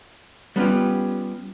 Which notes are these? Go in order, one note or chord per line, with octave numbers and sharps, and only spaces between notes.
G3 B3 C#4 F4 G4